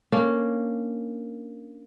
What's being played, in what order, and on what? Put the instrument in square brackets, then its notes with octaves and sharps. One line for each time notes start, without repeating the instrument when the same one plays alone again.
[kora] A#3 C#4 D4